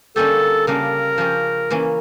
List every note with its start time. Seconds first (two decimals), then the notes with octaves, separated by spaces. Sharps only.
0.16 D3 G3 A#3 C#4 G4 A4
0.67 C#3 G3 A#3 D4 A#4
1.18 F3 C#4 G4
1.70 E3 A#3 C#4 E4